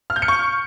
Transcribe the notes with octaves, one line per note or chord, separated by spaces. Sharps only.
F6
G6
C#7
C#6